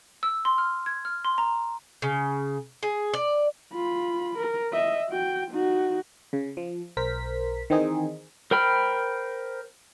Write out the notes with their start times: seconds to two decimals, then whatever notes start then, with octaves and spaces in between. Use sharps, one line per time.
0.23 E6
0.45 C6
0.58 F6
0.86 G#6
1.05 F6
1.25 C6
1.38 A#5
2.02 C#3
2.83 G#4
3.14 D5
3.74 F4 B5
4.38 A#4
4.73 D#5 E5
5.09 F#4 G5
5.51 D#4 F#4
6.33 C#3
6.57 F3
6.97 B1 A#4 C5 B6
7.70 D#3 E3 C4 D#4 G#4
8.51 A#4 C5 G5 B5 F6